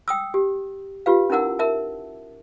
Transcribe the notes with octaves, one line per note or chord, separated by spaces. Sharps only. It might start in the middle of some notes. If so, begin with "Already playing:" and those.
G5 D#6 E6
G4
F4 G4 B4 F5
C#4 D#4 E4 A#4 F#5 E6
A#4 E5 A5